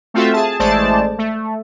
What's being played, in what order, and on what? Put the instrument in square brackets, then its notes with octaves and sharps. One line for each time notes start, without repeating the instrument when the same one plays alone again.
[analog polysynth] A3 C4 F4 F#4 A4 E5
G#4 A5
A1 G#3 A3 C5 D5 A5
A3